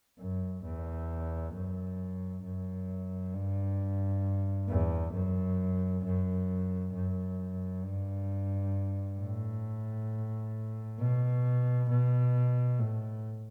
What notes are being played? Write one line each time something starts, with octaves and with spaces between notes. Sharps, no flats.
F#2
E2
F#2
F#2
G2
E2
F#2
F#2
F#2
G2
A2
B2
B2
A2